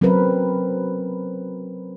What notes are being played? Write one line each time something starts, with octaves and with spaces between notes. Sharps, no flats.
F#3 C4 C#4 A#4 B4